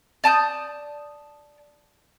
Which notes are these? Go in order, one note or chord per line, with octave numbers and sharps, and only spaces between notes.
D5 A5 D#6 G6